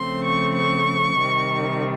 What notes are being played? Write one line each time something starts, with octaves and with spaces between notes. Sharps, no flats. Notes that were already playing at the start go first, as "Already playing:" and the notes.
Already playing: C#3 F3 A3 C4 C6
C#6
C#6
C3 D#3 G3